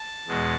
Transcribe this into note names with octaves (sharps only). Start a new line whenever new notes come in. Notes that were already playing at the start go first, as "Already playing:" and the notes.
Already playing: A5
E2 B2 G#3